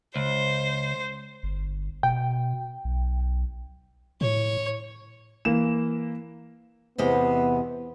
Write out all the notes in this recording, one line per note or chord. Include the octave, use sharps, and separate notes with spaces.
C#2 C5
G1
B2 G5
B1
A2 C#5
E3 A#3 E7
E2 C3 B3 D#5